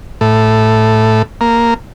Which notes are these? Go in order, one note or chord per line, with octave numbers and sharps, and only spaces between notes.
A2
A#3